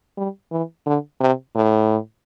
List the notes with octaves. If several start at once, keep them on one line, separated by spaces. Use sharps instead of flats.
G3
E3
D3
C3
A2